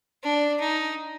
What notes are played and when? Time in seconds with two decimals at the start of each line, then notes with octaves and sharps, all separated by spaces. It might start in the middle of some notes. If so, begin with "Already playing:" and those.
0.23 D4
0.60 D#4